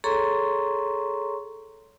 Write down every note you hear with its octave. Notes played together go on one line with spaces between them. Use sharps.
G#4 A4 C#5 A#5 C6 C#6